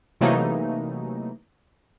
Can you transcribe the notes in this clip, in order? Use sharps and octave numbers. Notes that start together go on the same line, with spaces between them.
C3 E3 F#3 A3 A#3 D#4